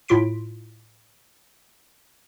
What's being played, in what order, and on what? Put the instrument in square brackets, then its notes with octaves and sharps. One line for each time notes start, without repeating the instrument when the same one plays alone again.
[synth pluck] A2 E4 F4 C6 B6 D7